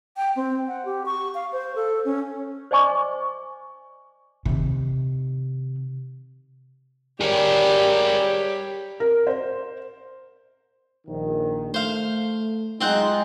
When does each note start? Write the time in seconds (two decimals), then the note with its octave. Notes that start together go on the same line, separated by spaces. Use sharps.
0.17 G5
0.36 C4
0.68 F#5
0.85 G4
1.06 C#6
1.35 F5
1.52 C5
1.76 A4
2.05 C#4
2.71 C5 D5 D#5 G#5 C#6 D6
4.46 C3 D#3
7.21 G3 G4 G#4 A#4 C#5
9.00 A#4
9.27 C5
11.07 A#1 D#3
11.74 A3 C5 F5
12.81 F#3 G#3 C4 D#4 F4 C5 F#5